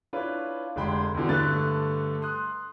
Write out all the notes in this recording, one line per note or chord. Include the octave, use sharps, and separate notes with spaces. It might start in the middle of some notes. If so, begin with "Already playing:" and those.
D4 E4 F4 B4 C#5
F1 D3 G#3 G5 B5 C6
E2 B2 D3 E3
G2 D3 A3 B4 F#6 A6
C6 D#6 F#6